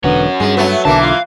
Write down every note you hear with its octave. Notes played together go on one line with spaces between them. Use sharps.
E1 D3 B3 C#4 F#4
G2 G#3 G#4
F#3 A3 B3
B1 D3 E3 A#3 A5
F4 F5